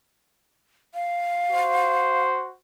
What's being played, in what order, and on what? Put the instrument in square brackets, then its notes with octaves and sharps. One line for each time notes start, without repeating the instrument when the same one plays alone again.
[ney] F5
[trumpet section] F#4 C5